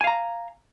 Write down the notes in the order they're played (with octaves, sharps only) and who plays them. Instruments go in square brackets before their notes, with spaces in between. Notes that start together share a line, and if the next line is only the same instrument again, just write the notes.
[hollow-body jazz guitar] G#5
F5
A#5